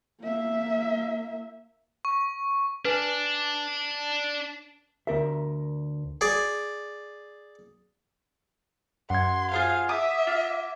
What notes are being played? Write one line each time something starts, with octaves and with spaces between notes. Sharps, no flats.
A#3 E5
C#6
D4 B4 G#5
D2 A#4 E5
G#4 D5
F#2 F#5 C6 G#6
F4 G#4 C5 F5
E5 D6 D#6
F4